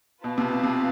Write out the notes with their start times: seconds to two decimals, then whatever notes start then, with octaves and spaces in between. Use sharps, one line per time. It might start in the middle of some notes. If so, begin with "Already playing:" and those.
0.24 B2 F4 B4 F5 A5
0.38 C3
0.50 B2
0.63 C3